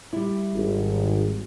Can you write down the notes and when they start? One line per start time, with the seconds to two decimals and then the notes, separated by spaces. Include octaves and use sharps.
0.13 G3 E4
0.55 G#1